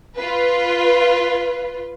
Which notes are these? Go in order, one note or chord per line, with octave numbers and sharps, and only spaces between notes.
F4 B4